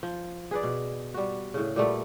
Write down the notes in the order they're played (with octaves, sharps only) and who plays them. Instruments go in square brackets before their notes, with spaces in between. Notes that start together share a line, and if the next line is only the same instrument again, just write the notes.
[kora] F3
G#4 B4 D5
B2
G3 F#4
A2 C#3
A#2 G3 A3 B3